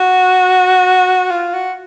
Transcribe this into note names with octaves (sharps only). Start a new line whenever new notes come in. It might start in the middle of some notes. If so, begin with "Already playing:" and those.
Already playing: F#4
F4
F#4